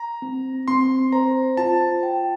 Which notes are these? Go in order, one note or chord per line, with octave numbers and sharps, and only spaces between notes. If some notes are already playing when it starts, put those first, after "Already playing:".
Already playing: A#5
C4
C4 C6
C5 A#5
F4 A5
G5